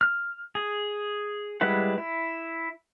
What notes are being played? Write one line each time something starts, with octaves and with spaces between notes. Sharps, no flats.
F6
G#4
G3 G#3 E4 B4 F#5
E4